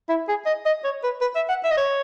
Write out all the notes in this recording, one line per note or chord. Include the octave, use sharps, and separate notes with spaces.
E4
G#4
D#5
D#5
C#5
B4
B4
E5
F#5
E5
D#5
C#5